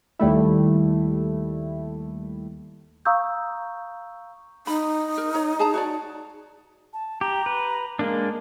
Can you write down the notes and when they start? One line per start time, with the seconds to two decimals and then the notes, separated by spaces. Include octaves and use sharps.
0.19 D#2 G3 A3 E4
3.05 F5 A#5 C#6 D#6 E6 G6
4.67 D#4 B5
5.18 A#4
5.35 C#5
5.59 G#4 A5 A#5
5.74 F#4 C#5 D5
6.93 A5
7.21 G4 A#5
7.46 B4
7.99 G#3 A#3 D4 A#4